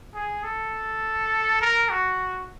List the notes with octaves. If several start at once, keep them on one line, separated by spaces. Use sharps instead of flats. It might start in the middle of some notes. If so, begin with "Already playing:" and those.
G#4
A4
A#4
F#4